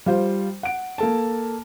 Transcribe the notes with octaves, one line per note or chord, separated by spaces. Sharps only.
G3 F4 C5
F#5 D7
A#3 A4 A5